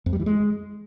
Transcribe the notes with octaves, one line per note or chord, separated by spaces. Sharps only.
F2
G3
E3
G#3